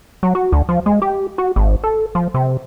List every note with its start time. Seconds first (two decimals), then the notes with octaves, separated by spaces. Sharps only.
0.23 F#3
0.35 F#4
0.52 D2
0.69 F3
0.86 G#3
1.02 G4
1.38 F#4
1.56 G#1
1.84 A4
2.15 F3
2.34 C3